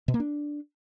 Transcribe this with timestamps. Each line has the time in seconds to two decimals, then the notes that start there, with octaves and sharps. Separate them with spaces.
0.08 B2
0.14 A#3
0.20 D4